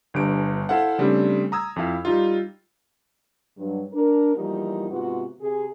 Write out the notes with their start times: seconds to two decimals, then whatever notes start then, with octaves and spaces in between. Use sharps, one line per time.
0.14 G1 G2 D7
0.69 E4 A4 C5 F5 F#5
0.98 C#3 G3 A3 C4 D4
1.52 A#5 D#6 E6 G#6
1.76 F2 E4 F5
2.05 G3 D#4 F4
3.58 G2 F#3
3.93 D4 A#4
4.35 E2 F3 G3 A#3 D#4 E4
4.89 G#2 C3 B3 F4 F#4
5.40 C3 G#4